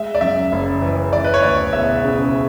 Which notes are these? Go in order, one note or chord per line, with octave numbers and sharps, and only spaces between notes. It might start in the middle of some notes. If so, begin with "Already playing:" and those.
Already playing: G#3 E5
D5
F#2 E5
F#1
E3
E3 D5
B4
C#5
D2 D5
E1 E5
C#3